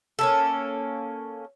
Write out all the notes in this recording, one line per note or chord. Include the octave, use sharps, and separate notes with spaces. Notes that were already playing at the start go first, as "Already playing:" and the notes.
A#3 C#4 A4